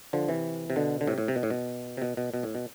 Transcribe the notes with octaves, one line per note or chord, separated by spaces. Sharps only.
D3 F3
C3 E3
C3
B2 D3
D3
A2 C3
A2
C3
B2
A2
B2
C3
B2
B2
B2
A2
B2